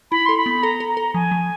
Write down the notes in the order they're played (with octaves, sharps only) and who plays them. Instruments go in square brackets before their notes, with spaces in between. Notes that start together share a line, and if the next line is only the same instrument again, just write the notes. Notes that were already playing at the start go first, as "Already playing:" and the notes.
[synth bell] E4 [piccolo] B5
[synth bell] A4 [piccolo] C6
[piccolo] B5
[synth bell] B3
[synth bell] A4 [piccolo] A#5
[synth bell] A4
[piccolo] A#5
[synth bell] A4
[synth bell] F3 [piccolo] G#5
[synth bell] F3